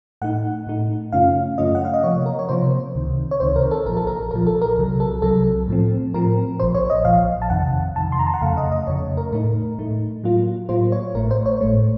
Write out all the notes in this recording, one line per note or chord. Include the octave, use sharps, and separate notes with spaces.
A2 A3 D#4 F#5
A2 A3 D#4
F#2 C#3 A3 C#4 F4 F5
F#2 C#3 A3 C#4 F4 D#5
F#5
F5
D#5
C3 F3 A#3 C#5
A#4
C#5
C3 F3 A#3 C5
C#2 C3 D#3
C#5
C#2 C3 D#3 C5
A#4
A4
A#1 A#2 F3 A#4
A4
A#4
A#1 A#2 F3 A#4
A4
A#4
C2 C3 F#3
A4
C2 C3 F#3 A4
A2 F3 C4
A2 F3 C4 A#4
A#1 A#2 F3 C5
C#5
D#5
A#1 A#2 F3 F5
A5
F2 C3 D#3 F#5
F2 C3 D#3 A5
C6
A#5
A5
F#5
F2 C#3 A3 F5
D#5
D#5
F2 C#3 A3 C#5
A#4
A2 A3 D#4 A#4
A2 A3 D#4
A2 F#3 A#3 F4
A2 F#3 A#3 F4 C5
C#5
A1 A2 A3 A#4
C5
C#5
A1 A2 A3